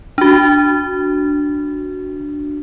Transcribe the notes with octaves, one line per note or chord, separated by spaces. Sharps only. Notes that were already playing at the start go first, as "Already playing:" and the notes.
D4 F#4